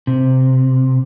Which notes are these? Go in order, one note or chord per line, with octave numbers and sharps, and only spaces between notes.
C3